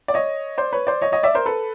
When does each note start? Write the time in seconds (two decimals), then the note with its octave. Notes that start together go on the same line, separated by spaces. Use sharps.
0.08 D5
0.14 C#5 D#5
0.58 C5 D5
0.73 B4 C#5
0.87 C5 D5
1.02 C#5 D#5
1.12 C#5 D#5
1.23 D5 E5
1.35 A#4 C5
1.46 A4 B4